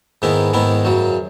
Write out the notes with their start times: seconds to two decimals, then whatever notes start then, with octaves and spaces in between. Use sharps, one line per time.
0.22 G#2 D#3 G#3 B3 E4
0.53 G#2 D#3 G#3 B3 E4
0.85 F#2 C#3 F#3